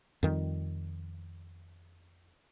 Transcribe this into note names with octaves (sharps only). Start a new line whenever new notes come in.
F2 D#3 G3